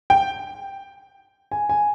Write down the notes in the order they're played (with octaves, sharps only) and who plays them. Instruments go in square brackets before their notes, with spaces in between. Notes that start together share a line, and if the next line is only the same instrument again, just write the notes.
[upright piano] G5
G#5
G#5